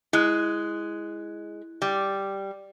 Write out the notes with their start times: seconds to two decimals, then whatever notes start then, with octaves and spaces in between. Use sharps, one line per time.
0.13 G#3 E4 F#6 G#6
1.82 G3